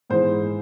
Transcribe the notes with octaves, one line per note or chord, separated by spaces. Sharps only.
G#2 E3 G#3 C5